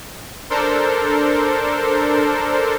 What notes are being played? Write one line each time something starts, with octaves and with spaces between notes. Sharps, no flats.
D4 A4 A#4 C5